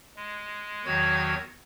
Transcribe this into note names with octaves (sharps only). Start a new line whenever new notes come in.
G#3
E2 D#3 F#3 F#4 C#5 G#6